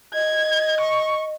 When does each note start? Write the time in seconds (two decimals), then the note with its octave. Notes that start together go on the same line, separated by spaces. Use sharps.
0.14 D#5 G#6
0.80 C#6